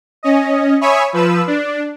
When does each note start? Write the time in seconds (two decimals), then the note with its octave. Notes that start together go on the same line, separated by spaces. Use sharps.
0.23 C#4 D#5
0.81 C#5 E5 G#5 B5 C#6 D#6
1.13 F3 B4 E6
1.47 D4